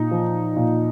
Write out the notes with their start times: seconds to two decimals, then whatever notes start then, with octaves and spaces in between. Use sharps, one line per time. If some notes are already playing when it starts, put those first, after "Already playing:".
Already playing: A#2 D#4
0.11 F3
0.56 A#2